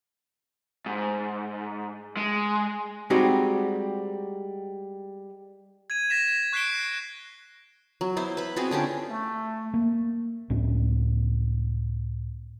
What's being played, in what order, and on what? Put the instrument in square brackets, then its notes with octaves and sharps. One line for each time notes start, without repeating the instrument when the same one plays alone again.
[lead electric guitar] G#2
G#3
[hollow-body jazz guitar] G3 G#3 C4 D#4 F#4 G4
[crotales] G#6 D#7
G#6 A#6 B6 E7
C#6 F#6 B6 C7 D7 G7
[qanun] F#3
B3 E4 C5
B4 B5
B3 C4 F#4 G#4
D3 C#4 F4 G4
[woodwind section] A3
[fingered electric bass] A#3
C#2 A2 B3 C#4